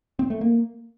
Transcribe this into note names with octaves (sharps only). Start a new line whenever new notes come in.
C4
A3
A#3